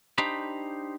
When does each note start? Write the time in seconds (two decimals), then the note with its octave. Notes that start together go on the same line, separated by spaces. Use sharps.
0.18 D4 D#4 G4 C5 A#5 B5